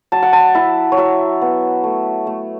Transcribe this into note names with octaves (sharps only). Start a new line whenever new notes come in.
F#3 A5
F#5
A5
E4 E5
C#5
F#3 E5
B3
A3
A3